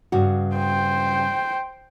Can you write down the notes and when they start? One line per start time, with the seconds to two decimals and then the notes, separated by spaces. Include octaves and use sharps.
0.12 G2 C#3 F#4
0.56 C5 G5